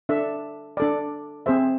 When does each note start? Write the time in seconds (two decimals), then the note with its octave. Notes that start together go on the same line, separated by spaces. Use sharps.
0.09 D4 A4 E5
0.77 D4 A4 D5
1.46 C4 G#4 C5 E5